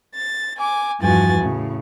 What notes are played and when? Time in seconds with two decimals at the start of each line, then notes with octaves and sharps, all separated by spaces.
0.15 A6
0.58 G#5 D6
1.01 E2 G2 F3 F#4 G#5 A6
1.41 A2 C#3